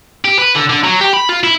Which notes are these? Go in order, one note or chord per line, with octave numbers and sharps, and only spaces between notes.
G4
B4
D3
D3
F#3
G4
B5
F4
E4